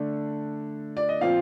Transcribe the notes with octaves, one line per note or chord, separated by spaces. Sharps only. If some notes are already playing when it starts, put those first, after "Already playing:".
Already playing: D3 A3 D4
D5
D#5
A#2 F3 C4 F5